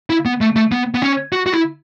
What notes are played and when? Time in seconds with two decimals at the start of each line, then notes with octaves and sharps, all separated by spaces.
0.10 E4
0.25 B3
0.41 A3
0.56 A3
0.72 B3
0.94 B3
1.02 C#4
1.33 F#4
1.46 F#4
1.53 E4